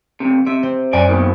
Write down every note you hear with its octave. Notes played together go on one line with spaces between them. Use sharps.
F2 C3
C3 E5
C4
F#2 D5 G#5
D#2 B2 D#3